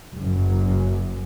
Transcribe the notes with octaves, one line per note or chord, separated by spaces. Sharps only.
F#1 F#2